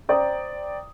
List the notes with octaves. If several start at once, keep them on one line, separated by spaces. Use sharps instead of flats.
C5 D5 G5 A#5 D#6